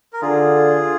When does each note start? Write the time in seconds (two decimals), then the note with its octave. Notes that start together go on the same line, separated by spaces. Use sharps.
0.13 A#4
0.21 D3 F4 G#4